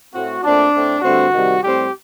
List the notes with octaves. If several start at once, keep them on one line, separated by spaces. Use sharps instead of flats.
A2 A3 C4 F#4
A#2 A3 C4 D4
A2 A3 C4
G2 D3 A3 C4 F#4
C3 D#3 G3
A2 G3 C4 G4